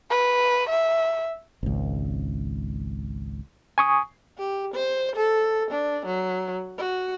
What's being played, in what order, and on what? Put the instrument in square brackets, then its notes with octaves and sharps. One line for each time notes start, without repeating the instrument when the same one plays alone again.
[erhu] B4
E5
[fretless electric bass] G#1 C#2
[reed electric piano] G#5 C#6 D#6
[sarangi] G4
C5
A4
D4
F#3
F#4